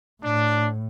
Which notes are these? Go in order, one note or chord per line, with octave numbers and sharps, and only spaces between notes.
A2 D4